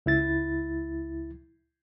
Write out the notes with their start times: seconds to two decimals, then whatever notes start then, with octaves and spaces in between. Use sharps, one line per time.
0.06 C#2 E4 A6